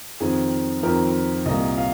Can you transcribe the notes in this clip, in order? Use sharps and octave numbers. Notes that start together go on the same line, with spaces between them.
F2 D#3 C4 G#4
F2 D#3 C4 A#4
C2 A#2 A#3 D#5
F5